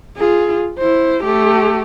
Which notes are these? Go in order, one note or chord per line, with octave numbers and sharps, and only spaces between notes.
F4 G#4
E4 C5
A3 G4